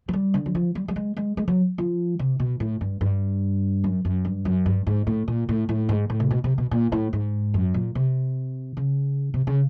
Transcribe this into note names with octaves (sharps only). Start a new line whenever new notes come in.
F#3
G3
D3
F#3
F3
G3
G3
G#3
G#3
G#3
F#3
F3
C3
B2
A2
G2
G2
F#2
F#2
G2
F#2
G2
G#2
A2
A#2
A2
A2
G#2
A2
C3
B2
C3
B2
A#2
A2
G#2
F#2
A#2
C3
C#3
C3
C#3